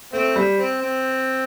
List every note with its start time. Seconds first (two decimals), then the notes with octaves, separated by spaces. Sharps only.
0.13 A3 C4
0.36 G3
0.59 C4
0.81 C4